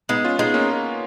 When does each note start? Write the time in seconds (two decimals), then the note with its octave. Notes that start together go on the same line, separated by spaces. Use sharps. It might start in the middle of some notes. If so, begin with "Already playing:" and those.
0.09 G#3 B3 D#4
0.24 C#4 F4
0.39 G#3 B3 D#4
0.54 A#3 C#4